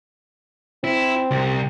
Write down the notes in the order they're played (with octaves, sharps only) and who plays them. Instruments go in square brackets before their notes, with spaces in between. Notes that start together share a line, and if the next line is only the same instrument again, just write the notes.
[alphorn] C4 [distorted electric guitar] E4
[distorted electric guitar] C2